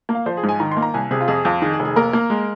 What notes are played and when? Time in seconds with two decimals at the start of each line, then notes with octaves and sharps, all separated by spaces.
0.09 A#3
0.15 F5
0.26 F3 C5
0.37 G#4
0.43 G#2
0.49 G#5
0.60 D#3 A#5
0.71 C6
0.77 A#3
0.82 A#5
0.94 C2 G#5
1.11 C3 G#4
1.21 F4
1.28 F2 G#4
1.45 F2 F4
1.62 D#3 G#4
1.73 G#4
1.79 F1
1.85 G#4
1.96 A#3 A#4
2.13 A#3
2.30 G#3